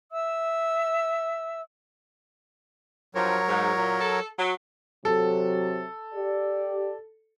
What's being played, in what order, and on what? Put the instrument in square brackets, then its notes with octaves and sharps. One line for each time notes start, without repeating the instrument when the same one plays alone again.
[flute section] E5 E6
[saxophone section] G2 F3 [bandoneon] F#3 A#4 C#5
[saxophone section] G#2
A#2
A4
F#3
[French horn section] C3 F#3 [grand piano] A4
[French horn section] G4 D5